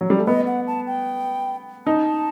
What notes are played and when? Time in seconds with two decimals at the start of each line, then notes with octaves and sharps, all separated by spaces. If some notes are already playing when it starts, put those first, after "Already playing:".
0.01 F#3
0.10 G3
0.19 A3
0.27 B3 D#5
0.47 F#5
0.67 A5
0.87 G5
1.86 D#4 A5